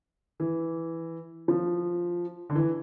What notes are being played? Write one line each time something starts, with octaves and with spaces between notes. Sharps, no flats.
E3
F3
D3
E3